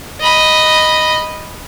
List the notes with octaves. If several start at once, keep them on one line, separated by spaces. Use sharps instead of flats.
D#5 B5